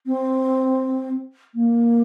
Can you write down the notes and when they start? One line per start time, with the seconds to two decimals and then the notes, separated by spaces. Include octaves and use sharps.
0.07 C4
1.55 A#3